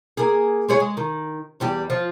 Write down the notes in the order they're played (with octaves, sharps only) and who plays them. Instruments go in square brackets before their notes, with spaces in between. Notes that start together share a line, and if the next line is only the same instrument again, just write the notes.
[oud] A#3 G#4
G#3 G#4 C#5
G#3
D#3
E2 G3 G4
F3